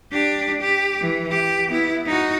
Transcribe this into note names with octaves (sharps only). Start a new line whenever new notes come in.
D4 G4
G4
E3
G4
B3 E4
D#4 F#4